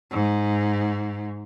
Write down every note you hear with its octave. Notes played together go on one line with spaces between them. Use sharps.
G#2